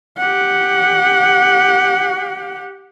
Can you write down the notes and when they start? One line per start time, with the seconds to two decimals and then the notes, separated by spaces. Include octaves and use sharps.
0.18 G4 F#5